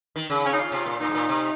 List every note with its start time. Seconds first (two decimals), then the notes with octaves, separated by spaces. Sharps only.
0.16 D#3
0.30 C#3
0.45 C#4
0.53 D#4
0.59 F4
0.72 C3
0.86 A#2
1.01 A#2 D#4
1.09 G#2
1.14 A#2
1.29 C3